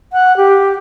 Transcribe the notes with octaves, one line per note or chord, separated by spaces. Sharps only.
F#5
G4